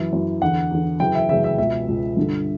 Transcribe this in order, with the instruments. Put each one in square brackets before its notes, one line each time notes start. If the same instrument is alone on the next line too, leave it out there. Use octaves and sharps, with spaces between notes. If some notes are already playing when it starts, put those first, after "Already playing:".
Already playing: [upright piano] F#2 E3
F#2 E3
E2 D3 F#5
E2 D3
F#2 C#3 E3 G5
E5
F#2 C#3 E3 E5
E5
C#2 B2 E5
C#2 B2
G2 D3